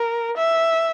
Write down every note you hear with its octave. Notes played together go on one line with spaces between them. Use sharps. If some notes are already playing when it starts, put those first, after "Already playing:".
Already playing: A#4
E5